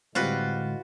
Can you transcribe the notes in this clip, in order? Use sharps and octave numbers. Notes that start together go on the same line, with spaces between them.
A2 D3 G3 G#3 C4 F4 F#4 B4